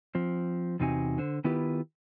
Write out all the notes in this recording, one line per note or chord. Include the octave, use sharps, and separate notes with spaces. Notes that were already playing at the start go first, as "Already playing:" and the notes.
F3 C4
E2 C3 C4 D#4 F#4 G#5
D3 C5
D#3 B3 E4 F4 G4 B4